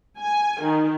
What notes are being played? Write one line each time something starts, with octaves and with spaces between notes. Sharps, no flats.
G#5
D#3